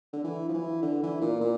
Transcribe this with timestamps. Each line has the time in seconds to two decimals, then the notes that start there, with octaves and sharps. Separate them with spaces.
0.13 D3
0.24 E3
0.49 F3
0.54 E3
0.82 D3
1.03 E3
1.21 A#2
1.41 A#2